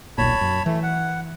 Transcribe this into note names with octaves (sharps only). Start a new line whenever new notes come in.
D#1 B1 A#2 C#5 A5 B5
F#2
E3 A3
F#5